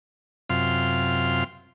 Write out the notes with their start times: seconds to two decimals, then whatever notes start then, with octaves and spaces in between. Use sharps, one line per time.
0.50 F#2 C3 F4 C6 F6